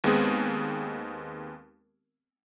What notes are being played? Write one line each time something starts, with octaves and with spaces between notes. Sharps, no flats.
D#2 G#3 B3 C4 G#4